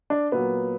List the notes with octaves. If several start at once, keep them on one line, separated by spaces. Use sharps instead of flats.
D4
A#2 F#3 A#3 B3